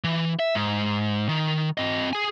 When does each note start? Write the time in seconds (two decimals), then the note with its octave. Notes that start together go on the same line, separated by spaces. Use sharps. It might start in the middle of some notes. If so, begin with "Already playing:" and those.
0.04 E3
0.39 E5
0.55 G#2
1.29 D#3
1.78 C4 D#5
2.13 G#4 G#5